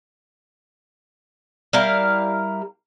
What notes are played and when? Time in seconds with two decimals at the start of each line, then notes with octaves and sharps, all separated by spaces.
1.73 G3 E4 A#4 F5